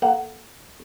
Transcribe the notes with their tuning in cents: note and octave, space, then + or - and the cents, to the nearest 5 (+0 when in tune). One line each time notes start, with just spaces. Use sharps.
A#3 +5 A4 +0 F#5 +20